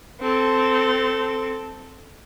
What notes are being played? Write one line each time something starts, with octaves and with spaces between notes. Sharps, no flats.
C4 A4